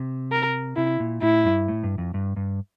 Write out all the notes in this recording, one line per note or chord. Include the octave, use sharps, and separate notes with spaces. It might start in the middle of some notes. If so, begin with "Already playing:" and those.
Already playing: C3
A#4
C3 E4
A#2
A2 E4
G2
A2
G2
F2
G2
G2